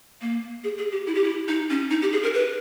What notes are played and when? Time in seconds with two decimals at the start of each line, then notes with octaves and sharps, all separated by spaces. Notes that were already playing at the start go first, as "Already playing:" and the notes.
0.21 A#3
0.64 G#4
0.78 G#4
0.92 G4
1.07 E4
1.15 G4
1.24 E4
1.48 D#4
1.70 C#4
1.91 D#4
2.02 G4
2.12 G#4
2.23 A#4
2.34 B4